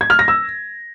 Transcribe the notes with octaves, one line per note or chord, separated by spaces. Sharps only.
G#6
F6
A#6
E6